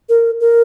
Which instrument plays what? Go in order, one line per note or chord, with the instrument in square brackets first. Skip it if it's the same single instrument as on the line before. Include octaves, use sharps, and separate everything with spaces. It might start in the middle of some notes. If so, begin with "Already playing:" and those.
[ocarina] A#4
A#4